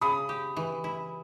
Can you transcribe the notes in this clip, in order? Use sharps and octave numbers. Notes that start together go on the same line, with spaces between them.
C#3 B5 D#6
G4
E3
E4